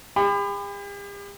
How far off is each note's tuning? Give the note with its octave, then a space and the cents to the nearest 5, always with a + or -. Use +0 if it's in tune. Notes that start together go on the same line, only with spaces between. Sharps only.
G4 +45 B5 +30